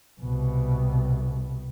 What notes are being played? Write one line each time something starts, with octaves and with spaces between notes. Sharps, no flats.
C2 B2